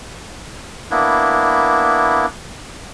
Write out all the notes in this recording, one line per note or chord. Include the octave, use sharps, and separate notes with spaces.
A#3 B3 D4 E4